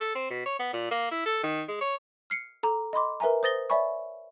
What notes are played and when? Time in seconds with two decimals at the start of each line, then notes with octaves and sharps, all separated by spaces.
0.01 A4
0.15 C4
0.30 B2
0.46 C#5
0.59 B3
0.73 A#2
0.91 A#3
1.11 E4
1.25 A4
1.43 D#3
1.68 G#3
1.81 C#5
2.30 F6 C7 C#7
2.63 A4 A#5 D6
2.93 D#5 B5 C6 D6
3.20 A#4 B4 E5 G#5 A#5
3.43 C5 D#6 A6 A#6 G7
3.70 C#5 D5 E5 G#5 B5 C#6